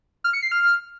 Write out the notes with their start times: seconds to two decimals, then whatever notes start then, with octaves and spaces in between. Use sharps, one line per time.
0.24 F6
0.33 C#7
0.42 C7
0.52 F6